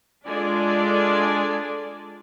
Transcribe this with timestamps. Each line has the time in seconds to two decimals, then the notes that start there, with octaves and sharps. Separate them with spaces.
0.25 G#3 D4 F4 A4 D5 G#5